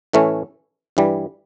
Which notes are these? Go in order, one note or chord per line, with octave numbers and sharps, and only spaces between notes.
A2 E3 A3 C#4
G2 E3 G3